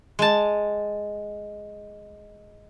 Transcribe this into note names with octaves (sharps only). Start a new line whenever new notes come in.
G#3 A5